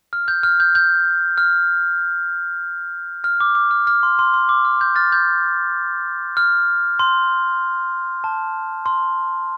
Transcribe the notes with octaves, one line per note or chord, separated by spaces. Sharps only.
F6
G6
F6
G6
G6
F6
F6
D6
D6
F6
F6
C6
C6
C6
D6
F6
G6
F6 A6
G6
F6
C6
A5
C6